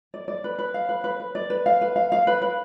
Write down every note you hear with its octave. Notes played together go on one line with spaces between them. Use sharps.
D5
D5
B4
B4
F5
B4
B4
B4
D5
B4
F5
B4
F5
F5
B4
B4